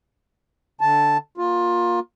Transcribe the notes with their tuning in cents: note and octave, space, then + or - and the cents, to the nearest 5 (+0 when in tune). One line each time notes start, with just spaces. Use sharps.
D3 -5 A5 +0
A#3 +15 F4 +20